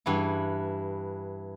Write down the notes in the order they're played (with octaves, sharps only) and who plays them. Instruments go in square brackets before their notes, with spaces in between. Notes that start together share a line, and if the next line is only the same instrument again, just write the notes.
[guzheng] G2 E3 E4